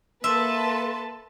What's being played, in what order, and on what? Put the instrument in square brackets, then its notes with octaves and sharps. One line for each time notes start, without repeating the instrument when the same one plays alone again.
[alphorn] A#3 [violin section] A4 B4 A5 [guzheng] E5 [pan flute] C6